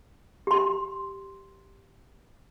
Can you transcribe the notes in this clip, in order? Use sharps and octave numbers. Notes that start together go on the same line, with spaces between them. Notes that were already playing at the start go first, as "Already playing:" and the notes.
G4 C6